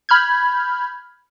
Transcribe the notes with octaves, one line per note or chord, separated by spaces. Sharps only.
B5 F6 G6 G#6